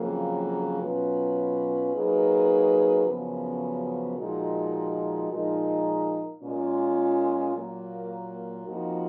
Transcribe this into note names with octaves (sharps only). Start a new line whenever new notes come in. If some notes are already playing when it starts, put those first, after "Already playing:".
Already playing: F2 C#3 F#3 A#3
B2 F#3 C#4 F4 B4
F#3 A#3 D#4 G#4 B4
F#2 C#3 F3 B3 F#4
A#2 F3 G#3 D#4 F#4
A#2 F3 G#3 D#4 A#4
A#2 G#3 C#4 F4
A#2 F#3 A#3
F2 F3 A#3 D#4 F#4